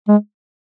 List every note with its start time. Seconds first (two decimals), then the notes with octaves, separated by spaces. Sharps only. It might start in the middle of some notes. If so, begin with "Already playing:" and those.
0.08 G#3